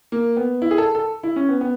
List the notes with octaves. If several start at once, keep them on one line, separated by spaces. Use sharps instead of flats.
A#3
B3
E4
G#4
A4
A4
E4
C#4
B3
B3